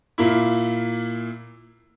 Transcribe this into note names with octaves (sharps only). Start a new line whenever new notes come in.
A#2 A#3 E4